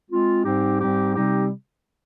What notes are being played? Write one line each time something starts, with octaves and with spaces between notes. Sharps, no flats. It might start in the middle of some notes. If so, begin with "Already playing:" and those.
G#3 C4 F4
G#2 G3 C4 D#4 G4
G#2 G3 C4 D#4 G4
C3 G3 C4 D#4 G4